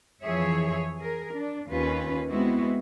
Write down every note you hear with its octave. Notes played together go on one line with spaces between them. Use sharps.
F2 E3 F3 G#4 C#5 E5
G#4 A#4
D4
D#2 C#4 F4 B4
G#3 B3 C4 E4 F#4